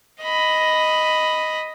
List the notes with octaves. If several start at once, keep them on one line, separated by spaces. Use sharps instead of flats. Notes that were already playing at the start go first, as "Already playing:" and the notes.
D#5 B5